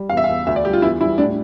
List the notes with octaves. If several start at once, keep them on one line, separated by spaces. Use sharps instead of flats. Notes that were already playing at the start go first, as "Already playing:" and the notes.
Already playing: G3
E2 F5
E5
F5
E2
D2 E5
D5
G3 G4
F4
E2 E4
G3 E4
A2 D4